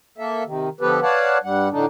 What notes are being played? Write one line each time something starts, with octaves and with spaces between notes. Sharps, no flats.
A#3 A4 E5
C3 D#3
D3 F3 B3 G4 A4 B4
B4 C#5 D5 F5 F#5 A5
G2 G3 F#5
A2 D3 D4 D#4